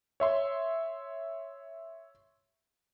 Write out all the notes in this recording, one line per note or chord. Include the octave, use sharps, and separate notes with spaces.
C#5 E5 C6